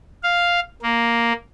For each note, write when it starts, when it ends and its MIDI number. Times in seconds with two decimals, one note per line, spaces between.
0.24 0.60 77
0.82 1.33 58